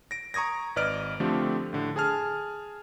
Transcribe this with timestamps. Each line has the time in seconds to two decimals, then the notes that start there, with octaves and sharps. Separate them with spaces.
0.11 A#6 D7
0.34 A#5 C#6 D#6 G#6 A#6
0.76 G#1 B4 D5 D#5 F6 D7
1.20 D3 F3 A3 C4 G4
1.73 A2 D3
1.96 G#4 G#5 A5 F6